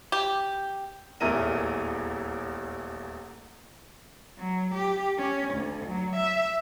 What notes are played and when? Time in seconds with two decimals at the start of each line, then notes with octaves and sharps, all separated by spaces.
0.12 G4
1.20 D#1 A1 E2 E4 A#4 D#7
4.38 F#3
4.75 G4
5.18 C#4
5.54 D2
5.86 F#3
6.16 E5